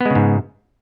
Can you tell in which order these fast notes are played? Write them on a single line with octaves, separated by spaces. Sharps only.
B3 G#3 C#3 G#2